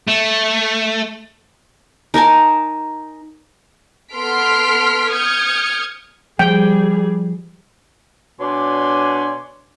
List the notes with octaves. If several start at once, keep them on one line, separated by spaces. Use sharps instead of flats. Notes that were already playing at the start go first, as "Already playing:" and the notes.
A3
D#4 A#4 G#5 A5
B3 A4 C6 F6 B6 D7
D#6 F6 G6 G#6 C#7
F3 G3 G#4 G5
B2 D4 C#5 D5 G#5 C6